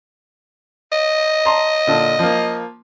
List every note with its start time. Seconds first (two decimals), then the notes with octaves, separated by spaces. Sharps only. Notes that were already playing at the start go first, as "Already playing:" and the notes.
0.92 D#5
1.45 A5 A#5 C6
1.87 A#2 D3 A5
2.19 F3 A#3